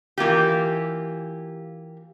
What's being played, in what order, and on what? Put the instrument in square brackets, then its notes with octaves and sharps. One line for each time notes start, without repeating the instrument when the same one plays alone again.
[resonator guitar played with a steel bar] E3 A#3 F4 G4